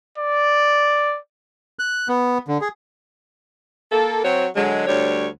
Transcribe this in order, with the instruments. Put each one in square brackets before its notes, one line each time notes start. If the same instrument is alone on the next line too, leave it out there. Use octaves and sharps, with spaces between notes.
[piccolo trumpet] D5
[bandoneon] F#6
B3
D3
G#4
[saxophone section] A#3 A4
F#3 C4 F#4 C#5
D3 F#3 G#3
D2 G3 C#5